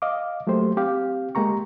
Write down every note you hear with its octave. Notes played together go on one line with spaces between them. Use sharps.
D#5 F5 D6
F#3 A3 A#3 G4 C5
C4 G4 F5
G#3 A#3 G4 A#5 C#6